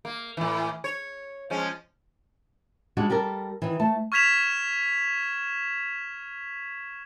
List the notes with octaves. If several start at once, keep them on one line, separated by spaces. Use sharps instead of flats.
A#3
A2 E3
C#5
F3 G#3 C#4
G3 G#3 D4 F#4
G3 G4 A4 A#4
D#3 E3
A3 A5
C#6 F6 G#6 B6 E7 F7